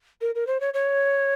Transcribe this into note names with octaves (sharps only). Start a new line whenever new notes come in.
A#4
A#4
C5
C#5
C#5